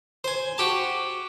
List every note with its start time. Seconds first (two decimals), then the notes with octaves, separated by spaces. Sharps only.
0.24 C5 G#5
0.58 F#4 G4 A5